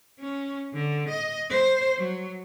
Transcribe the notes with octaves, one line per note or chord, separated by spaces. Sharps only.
C#4
D3
D#5
C5
F#3